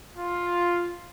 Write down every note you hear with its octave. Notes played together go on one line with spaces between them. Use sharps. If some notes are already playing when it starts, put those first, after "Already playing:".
F4